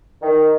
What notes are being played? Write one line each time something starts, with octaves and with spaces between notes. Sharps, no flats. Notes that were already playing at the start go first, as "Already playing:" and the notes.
D#3